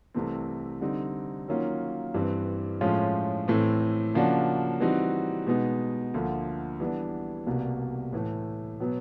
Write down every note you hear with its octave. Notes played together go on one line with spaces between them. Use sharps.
C2 C3 E3 A3 C4
D3 G3 C4 D#4
D#3 F#3 A#3 C#4 F4
G2 E3 G3 C4
A2 F3 G#3 C#4 F4
A2 E3 A3 C4
C#3 F3 A#3 D4 F#4
E3 G3 C4 D#4 F#4
B2 G#3 B3 D#4
D2 D3 F3 A#3
E3 G3 B3 D4
C2 B2 G3 A#3
A2 E3 A3
B2 F#3 B3